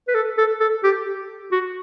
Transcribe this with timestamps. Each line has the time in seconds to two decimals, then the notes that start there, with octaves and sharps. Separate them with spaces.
0.08 B4
0.14 A4
0.38 A4
0.60 A4
0.84 G4
1.52 F#4